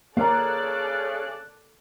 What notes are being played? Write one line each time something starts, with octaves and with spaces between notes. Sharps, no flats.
C#3 A#3 A4 D5 F5 A#5 F#6